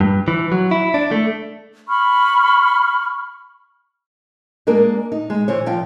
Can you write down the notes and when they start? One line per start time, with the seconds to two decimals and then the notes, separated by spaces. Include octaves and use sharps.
0.01 G2
0.28 E3
0.52 F#3
0.71 E4
0.94 D4
1.11 A3
1.88 B5 C#6 F6
4.67 G#3 A#3 D4 A#4
5.12 D#4
5.30 G#3
5.48 E3 C5 C#5
5.66 A#2 F3 F5 G5